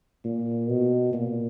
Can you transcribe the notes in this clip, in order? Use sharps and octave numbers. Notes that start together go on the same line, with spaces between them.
A#2
B2
A#2